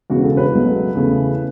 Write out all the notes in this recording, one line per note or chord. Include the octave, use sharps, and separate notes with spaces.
E1 E2 C#3 F#4
A4
B4
C#2 B2 F#3 A3
E2 C#3 A3